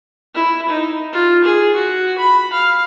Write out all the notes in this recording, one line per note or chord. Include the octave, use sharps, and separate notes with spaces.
E4
D#4
F4
G#4
F#4
B5
F5